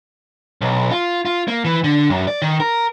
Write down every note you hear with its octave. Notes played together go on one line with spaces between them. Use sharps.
B1
F4
F4
A#3
E3
D3
F#2
D5
D#3
A#4